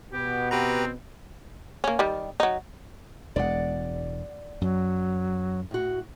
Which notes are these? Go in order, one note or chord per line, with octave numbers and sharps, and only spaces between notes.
B2 B3 G4
C4 G4 B4 A#5
A#3 C#4
D#3 G3
F#3 D#4
E1 E2 G#3 D5 F#5
F#2 F#3
A2 F#4